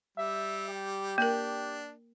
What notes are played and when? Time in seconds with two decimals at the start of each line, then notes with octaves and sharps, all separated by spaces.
0.18 G3 E5
0.68 G4
1.18 A#3 D4 A#4